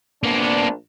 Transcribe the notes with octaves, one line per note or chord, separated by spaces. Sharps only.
A#1 A#3 B3 D4